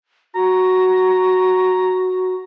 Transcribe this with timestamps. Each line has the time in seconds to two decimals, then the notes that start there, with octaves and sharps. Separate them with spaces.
0.35 F#4 A#5